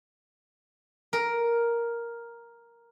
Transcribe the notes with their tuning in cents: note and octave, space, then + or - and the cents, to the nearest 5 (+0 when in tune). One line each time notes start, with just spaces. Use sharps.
A#4 +5